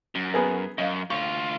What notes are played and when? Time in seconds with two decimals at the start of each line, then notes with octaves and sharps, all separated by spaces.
0.15 F#2
0.34 B3 G#4 A#4
0.78 F#2 D#5 F5
1.10 D2 F4 C#6